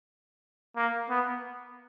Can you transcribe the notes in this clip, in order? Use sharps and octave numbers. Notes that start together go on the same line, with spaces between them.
A#3
B3